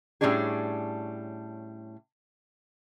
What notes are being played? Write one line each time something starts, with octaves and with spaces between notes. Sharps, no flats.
A2 F#3 G3 C#4 D4 G#4